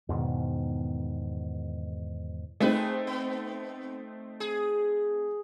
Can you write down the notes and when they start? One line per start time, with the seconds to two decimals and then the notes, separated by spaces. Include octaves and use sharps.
0.09 E2 G#2 B2 D#3
2.60 A3 C4 D#4 G#4 B4
3.07 B3
4.40 G#4